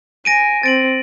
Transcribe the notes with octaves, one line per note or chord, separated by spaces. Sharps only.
G#5 A#6 D7 D#7
C4 A6 D7 F#7